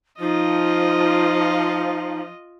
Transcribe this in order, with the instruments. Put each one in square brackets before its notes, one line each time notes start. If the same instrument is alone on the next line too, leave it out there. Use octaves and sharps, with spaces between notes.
[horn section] F3 [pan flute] D#4 [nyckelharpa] F4 D#5